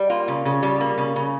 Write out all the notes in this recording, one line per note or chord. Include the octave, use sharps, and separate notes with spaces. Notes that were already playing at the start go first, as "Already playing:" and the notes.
Already playing: G3
A#3 F4
C#3
C#3
G3
A#3
C#3
C#3